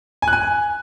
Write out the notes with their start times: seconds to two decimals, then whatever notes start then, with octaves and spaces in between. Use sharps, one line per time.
0.22 G#5
0.28 F#6
0.33 G#5